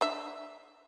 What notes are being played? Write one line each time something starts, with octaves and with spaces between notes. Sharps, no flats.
D4 E5